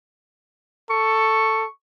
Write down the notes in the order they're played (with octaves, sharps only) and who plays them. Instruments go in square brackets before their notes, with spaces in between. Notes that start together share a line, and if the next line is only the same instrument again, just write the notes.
[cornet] A4 [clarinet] C#6